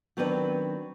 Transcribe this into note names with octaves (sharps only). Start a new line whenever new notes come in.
D#3 F#3 B3 C4 D4 B4